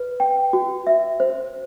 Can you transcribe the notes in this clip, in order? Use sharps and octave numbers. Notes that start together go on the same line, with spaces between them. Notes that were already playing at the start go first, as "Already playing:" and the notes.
Already playing: B4
G5
F#4
E5
C5